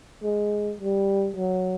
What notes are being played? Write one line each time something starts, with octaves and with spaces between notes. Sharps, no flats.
G#3
G3
F#3